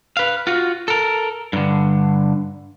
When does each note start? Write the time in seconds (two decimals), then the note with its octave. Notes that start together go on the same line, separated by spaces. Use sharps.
0.17 B4 F5
0.47 F4 F#4
0.88 A4 A#4
1.53 G2 D3